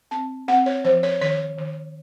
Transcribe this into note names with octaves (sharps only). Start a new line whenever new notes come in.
C4 A5
C4 F#5
C#5
F3 C5
C#5
D#3 C#5
D#3